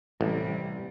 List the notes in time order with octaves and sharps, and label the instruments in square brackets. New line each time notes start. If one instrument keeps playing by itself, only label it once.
[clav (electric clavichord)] A1 [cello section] C3 G3